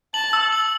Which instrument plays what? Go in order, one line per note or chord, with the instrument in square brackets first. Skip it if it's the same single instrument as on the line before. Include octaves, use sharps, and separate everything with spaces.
[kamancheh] A5 [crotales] F#7
[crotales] E6
F#7